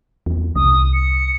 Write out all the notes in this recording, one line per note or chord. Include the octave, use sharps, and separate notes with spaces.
E2
C2 D#6
C#7